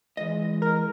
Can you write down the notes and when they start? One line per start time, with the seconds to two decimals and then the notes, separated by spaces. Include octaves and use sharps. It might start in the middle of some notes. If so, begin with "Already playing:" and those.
0.17 E3 G#3 D#5
0.62 A#4